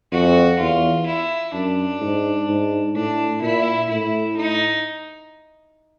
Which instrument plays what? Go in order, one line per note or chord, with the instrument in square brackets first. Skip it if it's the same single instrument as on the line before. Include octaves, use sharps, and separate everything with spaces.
[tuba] F2 [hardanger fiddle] F#4
[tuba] E2 [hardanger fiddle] F4
[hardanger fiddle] E4
[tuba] F#2 [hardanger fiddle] D4
[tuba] G#2
G#2
[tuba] A2 [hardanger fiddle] D4
[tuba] A#2 [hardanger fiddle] E4
[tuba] A2 [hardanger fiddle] E4
[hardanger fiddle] D#4